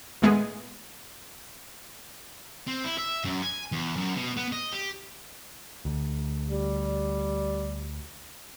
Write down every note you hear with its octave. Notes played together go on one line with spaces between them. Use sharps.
D#2 A2 G#3 B3 G#4
C4
E4
E5
F#2
G#5
E2
F#2
B2
B3
D#5
G4
D2
G3